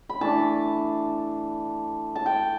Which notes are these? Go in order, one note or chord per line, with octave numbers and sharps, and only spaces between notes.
B5
E3 A3 D4 A5
A5
G5